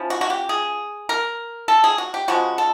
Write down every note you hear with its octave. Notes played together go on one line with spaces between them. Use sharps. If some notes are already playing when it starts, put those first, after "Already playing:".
Already playing: F3 C#4 E4
F#4
F#4
G4
G#4
A#4
A4
G#4
F#4
G4
C#3 F3 G#3 F#4
A4